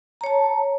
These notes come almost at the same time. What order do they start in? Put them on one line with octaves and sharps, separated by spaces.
A#5 C#5 A5